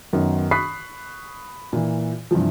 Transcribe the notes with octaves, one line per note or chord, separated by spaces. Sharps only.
F#2 D#3 B3 D#4
B5 C#6 D#6 F#6 B6 C7
A#2 E3
G2 C3 E3 F3